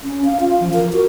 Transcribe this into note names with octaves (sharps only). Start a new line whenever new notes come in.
C#4
F5
F4
F3
A#4
F#4